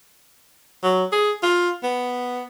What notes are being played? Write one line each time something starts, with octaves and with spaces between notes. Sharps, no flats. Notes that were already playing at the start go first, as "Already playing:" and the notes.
F#3
G#4
F4
B3